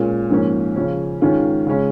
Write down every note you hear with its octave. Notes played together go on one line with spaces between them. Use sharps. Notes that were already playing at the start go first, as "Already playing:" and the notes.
Already playing: A#2 G#3 C#4
G#2 F3 A#3 C#4
C#3 F3 C#4
G#2 D#3 G#3 C#4 F4
C#3 G#3 C#4